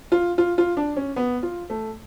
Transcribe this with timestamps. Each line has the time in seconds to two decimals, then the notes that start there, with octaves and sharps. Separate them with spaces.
0.12 F4
0.38 F4
0.58 F4
0.77 D4
0.96 C#4
1.16 B3
1.43 F4
1.70 A3